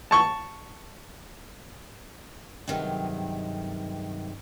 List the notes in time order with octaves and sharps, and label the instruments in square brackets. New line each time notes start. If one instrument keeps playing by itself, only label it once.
[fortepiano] A5 C#6
[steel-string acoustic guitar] G2 C3 D#3 F#3 G#3